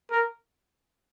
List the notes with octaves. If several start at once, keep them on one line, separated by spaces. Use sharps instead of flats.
A#4